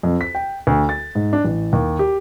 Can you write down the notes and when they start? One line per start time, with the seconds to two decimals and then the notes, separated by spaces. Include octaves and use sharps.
0.03 F2
0.21 B6
0.35 G5
0.67 D2
0.89 A6
1.15 G#2
1.33 D4
1.45 A1
1.73 D#2
1.99 G4